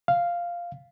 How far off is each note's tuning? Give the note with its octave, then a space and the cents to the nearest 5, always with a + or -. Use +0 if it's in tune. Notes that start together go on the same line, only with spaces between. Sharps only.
F5 -5